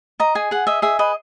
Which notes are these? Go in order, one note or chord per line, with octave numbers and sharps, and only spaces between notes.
D#5 A#5
G#4 G#5
G#4 F#5
D#5 E5
G#4 E5
B4 D#5